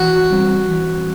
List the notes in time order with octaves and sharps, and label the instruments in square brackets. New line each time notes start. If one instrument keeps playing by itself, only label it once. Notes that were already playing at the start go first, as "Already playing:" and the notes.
Already playing: [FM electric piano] E3 [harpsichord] F#4
[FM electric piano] G3 C4
E3